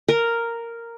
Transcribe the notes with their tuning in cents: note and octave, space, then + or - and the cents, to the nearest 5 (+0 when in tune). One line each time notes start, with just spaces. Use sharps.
A#4 -5